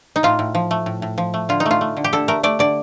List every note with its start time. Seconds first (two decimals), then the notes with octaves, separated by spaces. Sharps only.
0.16 D#4
0.23 A2 F4
0.39 A2
0.55 F3
0.71 A3
0.86 A2
1.02 A2
1.18 F3
1.34 A3
1.49 D3 F4
1.60 D#4
1.66 A3
1.71 F4
1.81 A3
1.97 D3
2.04 G4
2.13 D3 A4
2.28 A3 A#4
2.43 A3 D5
2.59 D3 D5